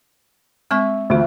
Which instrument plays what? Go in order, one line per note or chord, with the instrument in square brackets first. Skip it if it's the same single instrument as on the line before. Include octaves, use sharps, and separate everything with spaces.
[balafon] G#3 C4 C#6 [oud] E5
[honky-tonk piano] D2 [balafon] E3 F4